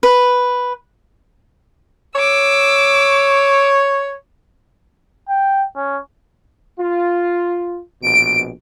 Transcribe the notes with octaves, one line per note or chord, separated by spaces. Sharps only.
B4
C#5 D6 E6
G5
C#4
F4
A#1 B2 D7